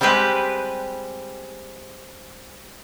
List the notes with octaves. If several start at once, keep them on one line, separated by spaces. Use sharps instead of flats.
G3 G#3 C4 G4 B4